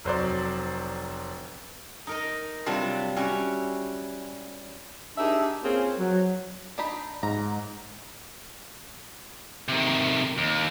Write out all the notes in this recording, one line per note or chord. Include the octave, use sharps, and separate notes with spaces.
F1 F#3 C5 D5
D#4 A#4 D#5
C3 F#3 G3 D4 F4
G3 C#4 E4 F#4
D4 D#4 G4 G#4 A#4 E5
A#3 C4 C#4 F4 G#4 C5
F#3
D4 D#4 B5
G#2 A#5
C3 D#3
D#2